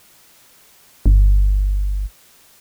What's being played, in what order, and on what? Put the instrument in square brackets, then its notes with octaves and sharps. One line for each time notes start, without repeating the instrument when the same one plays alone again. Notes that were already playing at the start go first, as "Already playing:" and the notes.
[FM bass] G1